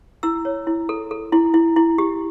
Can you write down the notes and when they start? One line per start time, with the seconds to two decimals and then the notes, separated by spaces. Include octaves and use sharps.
0.23 E4 E6
0.45 C#5
0.67 E4
0.89 A4
1.11 A4
1.32 E4
1.54 E4
1.76 E4
1.98 G4